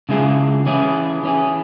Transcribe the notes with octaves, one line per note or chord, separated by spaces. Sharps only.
C#3 G#3 E4 G#4
E3 C#4 E4 G#4
E3 C#4 E4 G#4